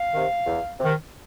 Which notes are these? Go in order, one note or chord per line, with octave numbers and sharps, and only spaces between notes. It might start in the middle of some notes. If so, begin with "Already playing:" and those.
Already playing: F5
C3 D#3
E2
C3 D#3